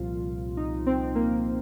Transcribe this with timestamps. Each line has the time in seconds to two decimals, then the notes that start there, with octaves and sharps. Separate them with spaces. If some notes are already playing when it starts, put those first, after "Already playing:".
Already playing: C2 A#2 F3 F4
0.57 D#4
0.86 C4
1.15 A#3